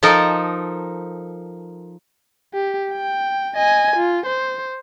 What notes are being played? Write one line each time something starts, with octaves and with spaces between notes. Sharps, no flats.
F3 D#4 A4 A#4 D#5
G4
G5
D#5 G#5
F4
C5